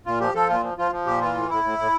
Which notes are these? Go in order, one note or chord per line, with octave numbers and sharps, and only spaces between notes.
A#2 F4
F3 G4
F3 A4
A#2 F4
F3
F3 F4
F3
A#2 G4
E3 F4
A2
A2 E4
A2
A2